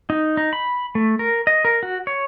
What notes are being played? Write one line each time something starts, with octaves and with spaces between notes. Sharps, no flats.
D#4
D#4
B5
A3
A#4
D#5
A#4
F#4
C#5